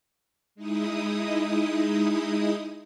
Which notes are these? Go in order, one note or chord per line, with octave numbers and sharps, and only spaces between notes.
G#3 D#4 E4 D#6